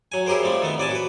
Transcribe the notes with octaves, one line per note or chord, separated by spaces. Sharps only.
F#3 G#5
E4 G4 G#4 A#4 C5
F3 G3 A3 C4
D#3 A3 B3
A1 D5 G#5 A5
F#4 B4